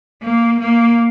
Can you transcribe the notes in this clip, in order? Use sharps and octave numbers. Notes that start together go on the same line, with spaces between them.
A#3
A#3